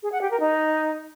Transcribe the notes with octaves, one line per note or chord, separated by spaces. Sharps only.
G#4
F#5
G4
A#4
D#4